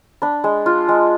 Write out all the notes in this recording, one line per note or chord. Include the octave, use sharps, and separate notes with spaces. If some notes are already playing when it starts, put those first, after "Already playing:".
D4 B5
G#3
F4
G#3